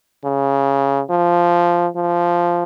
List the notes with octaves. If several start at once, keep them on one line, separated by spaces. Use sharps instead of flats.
C#3
F3
F3